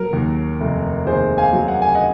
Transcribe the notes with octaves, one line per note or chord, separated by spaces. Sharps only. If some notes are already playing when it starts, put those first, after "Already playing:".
Already playing: F#3 A#4
D#2
F1
D#2 G#4 C5
F5 G#5
F#3
F#5
G#5
D#5 F#5